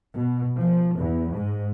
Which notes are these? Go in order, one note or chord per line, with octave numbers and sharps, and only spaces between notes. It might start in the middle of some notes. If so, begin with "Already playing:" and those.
B2
F3
E2
G#2